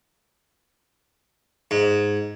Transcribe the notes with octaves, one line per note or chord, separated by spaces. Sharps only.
G#2